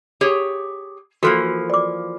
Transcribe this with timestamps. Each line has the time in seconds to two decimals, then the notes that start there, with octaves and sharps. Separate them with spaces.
0.21 G4 G#4 C#5
1.23 E3 F3 A#3 F#4 A4 C6
1.70 D5 D6